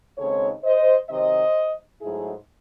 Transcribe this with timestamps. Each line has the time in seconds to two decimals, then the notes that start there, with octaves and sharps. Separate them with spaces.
0.18 D#2 C#3 G#3 C4 D#4 A4 C#5
0.64 C5 D#5
1.10 C3 D#3 F#3 C4 C5 D#5
2.01 G#2 F#3 A3 D#4 E4 G#4